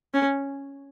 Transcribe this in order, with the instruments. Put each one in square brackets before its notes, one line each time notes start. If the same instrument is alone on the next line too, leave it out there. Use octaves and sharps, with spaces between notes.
[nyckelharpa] C#4